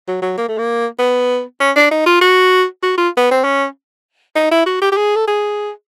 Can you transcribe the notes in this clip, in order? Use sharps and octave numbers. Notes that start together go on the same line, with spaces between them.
F#3
F#3
A#3
A3
A#3
B3
C#4
D4
D#4
F4
F#4
F#4
F4
B3
C4
C#4
D#4
E4
F#4
G4
G4
G#4
A4
G#4